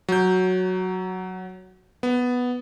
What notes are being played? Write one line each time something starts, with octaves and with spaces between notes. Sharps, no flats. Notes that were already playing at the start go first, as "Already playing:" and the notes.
F#3 G6
B3